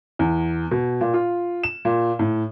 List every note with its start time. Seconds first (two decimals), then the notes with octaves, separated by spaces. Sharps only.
0.19 E2
0.71 B2
1.01 A#2
1.14 F4
1.63 E7
1.85 A#2
2.19 A2